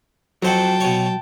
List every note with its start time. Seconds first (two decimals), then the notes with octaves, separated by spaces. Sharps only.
0.42 F2 F#3 C5 F#5 G5 A5
0.80 B2 C#5